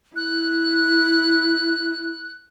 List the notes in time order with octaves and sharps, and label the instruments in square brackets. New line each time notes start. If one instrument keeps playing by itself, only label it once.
[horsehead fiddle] E4 [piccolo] F#6